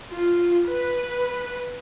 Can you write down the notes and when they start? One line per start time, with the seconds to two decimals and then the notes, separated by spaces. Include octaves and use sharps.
0.10 F4
0.67 B4